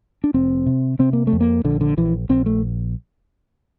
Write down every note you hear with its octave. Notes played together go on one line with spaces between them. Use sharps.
D4
F1 C4
C3
C3 C4
A#3
A3
F2
A#3
A#1 D3
D3
A#1 E3
A#1 C4
A3